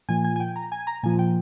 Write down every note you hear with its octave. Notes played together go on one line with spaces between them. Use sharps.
A#2 F3 G#5
G#5
G#5
G5
A#5
G#5
A#5
A#2 F3 G#5
G5